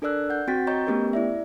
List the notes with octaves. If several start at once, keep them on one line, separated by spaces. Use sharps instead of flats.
D4 A4 A#4 D5 E6 F#6
F#5 G6
C4 F#4 G5 A6 B6
C#5 D#5 A#5 C#6 G6
A3 B3 C#4 G4 A#4
E4 D5 E5